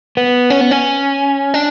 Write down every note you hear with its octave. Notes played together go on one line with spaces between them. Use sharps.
B3
C#4
B3
C#4
D4